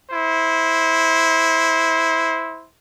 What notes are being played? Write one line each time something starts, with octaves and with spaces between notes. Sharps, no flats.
E4 C5